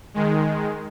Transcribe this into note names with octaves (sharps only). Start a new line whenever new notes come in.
D#3 G#3